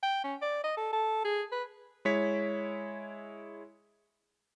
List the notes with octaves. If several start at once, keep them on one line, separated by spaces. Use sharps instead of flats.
G5
C#4
D5
D#5
A4
A4
G#4
B4
G#3 E4 C#5 B6